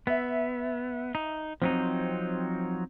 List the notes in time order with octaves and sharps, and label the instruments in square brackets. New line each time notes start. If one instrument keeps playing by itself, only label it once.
[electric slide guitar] B3 [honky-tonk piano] E5
[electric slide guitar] D#4
[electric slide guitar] F3 F#3 D#4 [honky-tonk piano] C4